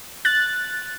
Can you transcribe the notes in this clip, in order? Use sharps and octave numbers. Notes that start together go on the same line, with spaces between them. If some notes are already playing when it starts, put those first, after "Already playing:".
F#6 A6